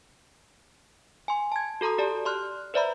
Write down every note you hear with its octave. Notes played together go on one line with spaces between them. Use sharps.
G#5 C6
A5 G#6
F#4 A4 A#5 C6 D#6
G4 D5 A5
D5 C6 F6 F#6
B4 C5 D5 E5 A#5 B5